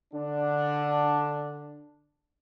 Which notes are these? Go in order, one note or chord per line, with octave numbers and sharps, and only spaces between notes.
D3 D4